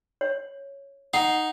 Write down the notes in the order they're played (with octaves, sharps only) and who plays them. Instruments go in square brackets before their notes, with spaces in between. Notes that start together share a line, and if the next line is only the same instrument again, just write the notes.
[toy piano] C#5
[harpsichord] D#4 [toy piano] F#5